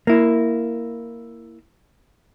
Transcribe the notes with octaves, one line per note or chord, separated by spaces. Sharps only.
A#3 E4